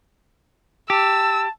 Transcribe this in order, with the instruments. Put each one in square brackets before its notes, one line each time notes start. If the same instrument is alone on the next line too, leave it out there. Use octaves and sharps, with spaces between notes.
[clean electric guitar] G4 [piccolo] A5 [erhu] E6